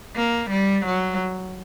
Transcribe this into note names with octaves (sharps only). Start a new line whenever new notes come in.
A#3
G3
F#3